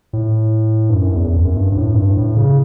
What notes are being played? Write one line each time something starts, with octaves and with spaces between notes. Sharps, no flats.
A2
G2
F#2
E2
F#2
G2
G2
A2
F#2
G2
A2
C#3